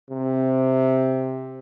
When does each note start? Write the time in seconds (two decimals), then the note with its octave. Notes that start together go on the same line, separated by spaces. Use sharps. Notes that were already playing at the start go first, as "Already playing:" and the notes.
0.10 C3